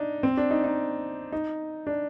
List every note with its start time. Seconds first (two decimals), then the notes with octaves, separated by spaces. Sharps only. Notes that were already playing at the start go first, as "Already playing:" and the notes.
Already playing: D4 D#4
0.23 C4
0.37 D4
0.51 D#4
0.64 D#4
1.32 D#4
1.87 D4